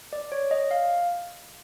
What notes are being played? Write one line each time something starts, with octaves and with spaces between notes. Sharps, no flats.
D5
C#5
D#5
F5